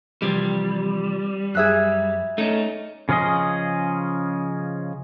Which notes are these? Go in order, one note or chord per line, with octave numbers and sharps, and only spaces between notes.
C3 E3 F3 G3
F#2 G#4 E5 F#6
A3 C#4 D#4
C#3 F3 C#4 G#4 D#5